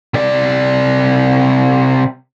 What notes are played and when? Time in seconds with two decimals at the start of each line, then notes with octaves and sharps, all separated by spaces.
0.14 C3 D5